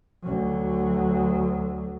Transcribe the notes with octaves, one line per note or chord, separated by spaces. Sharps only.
D2 F#3